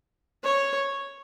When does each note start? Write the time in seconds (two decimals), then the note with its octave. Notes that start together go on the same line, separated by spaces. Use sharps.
0.44 C#5